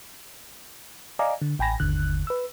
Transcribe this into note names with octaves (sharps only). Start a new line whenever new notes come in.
D5 D#5 F5 G#5 A#5 D6
D3
A1 G5 G#5 B5 A#6
G1 D#2 D3 F#6
B4 E6